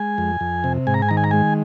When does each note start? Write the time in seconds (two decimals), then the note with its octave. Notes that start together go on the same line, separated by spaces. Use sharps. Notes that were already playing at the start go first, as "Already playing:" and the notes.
Already playing: G#3 G#5
0.18 F2
0.40 F2
0.64 C3
0.87 G#2 G#5
0.94 A#5
1.02 G#5
1.09 D#3 A#5
1.17 G#5
1.24 A#5
1.31 G#3 G#5